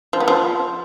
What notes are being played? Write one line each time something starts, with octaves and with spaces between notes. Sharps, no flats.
F3
B3
F3